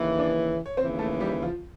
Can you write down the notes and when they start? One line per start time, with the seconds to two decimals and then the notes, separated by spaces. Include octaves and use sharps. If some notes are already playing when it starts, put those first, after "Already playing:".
Already playing: D#2 C#3 E3
0.18 D4 D5
0.66 C#5
0.77 D#2 C#3 E3 C4 C5
0.99 A3 A4
1.20 G3 G4
1.42 F3 F4